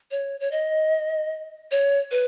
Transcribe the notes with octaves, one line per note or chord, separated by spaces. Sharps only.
C#5
C#5
D#5
C#5
B4